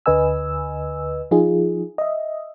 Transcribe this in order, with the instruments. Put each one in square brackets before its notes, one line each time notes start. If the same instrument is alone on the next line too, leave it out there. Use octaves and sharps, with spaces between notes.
[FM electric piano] D2 D3 B4 D#5 G#5 E6
F3 D#4 F4 G#4
D#5 E5